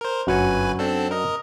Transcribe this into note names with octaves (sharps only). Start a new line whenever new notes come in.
A#4 C5
G1 F#2 F#4 B4 C#5 G#5
C4 D4 A4
A#4 D#5